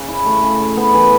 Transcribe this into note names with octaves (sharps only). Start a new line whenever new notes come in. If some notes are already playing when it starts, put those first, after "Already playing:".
Already playing: C#3
E4
A3
C#3
C#3
B3
E3